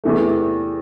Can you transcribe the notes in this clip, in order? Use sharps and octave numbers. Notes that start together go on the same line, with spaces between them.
E2 C3 E3 A3